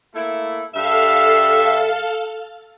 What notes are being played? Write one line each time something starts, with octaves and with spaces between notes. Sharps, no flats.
A3 A#3 E4
G2 A4 E5 F5